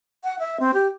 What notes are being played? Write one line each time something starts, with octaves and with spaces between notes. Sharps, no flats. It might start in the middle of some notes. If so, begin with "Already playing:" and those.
F#5
E5
C4
G4